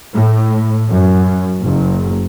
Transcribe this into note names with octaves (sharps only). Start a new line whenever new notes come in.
A2
F#2
F#1